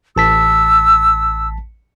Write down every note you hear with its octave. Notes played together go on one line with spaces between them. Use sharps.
A1 A5 E6 B6